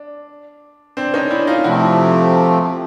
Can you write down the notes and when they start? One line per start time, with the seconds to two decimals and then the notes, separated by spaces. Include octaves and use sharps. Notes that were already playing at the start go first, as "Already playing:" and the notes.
Already playing: D4
0.97 C4 D4
1.14 C#4 D#4
1.31 D4 E4
1.47 D#4 F4
1.64 C3 F3 A3 C4 E4 F#4